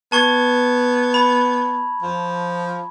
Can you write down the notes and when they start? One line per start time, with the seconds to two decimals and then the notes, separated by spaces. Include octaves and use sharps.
0.12 B3 A5 C#6 G#6
1.14 B5
2.02 F3